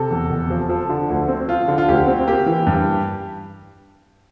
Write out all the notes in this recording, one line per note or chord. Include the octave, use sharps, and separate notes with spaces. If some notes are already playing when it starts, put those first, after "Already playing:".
Already playing: C3 A4
E2
F1
F3
F3
D3
D2
C4
F3 F4
D3
F4
D2 G4
C4
A#3 G4
E3
G2